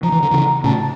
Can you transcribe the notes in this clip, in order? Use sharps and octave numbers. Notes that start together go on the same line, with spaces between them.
F3 A#5
E3
D3
C#3 E3
A2 C#3 A5